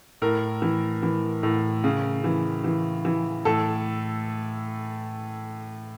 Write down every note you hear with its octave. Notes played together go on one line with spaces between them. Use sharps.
A2 A#4
E3
E3
A2
C#3
E3
E3
E3
A2 A4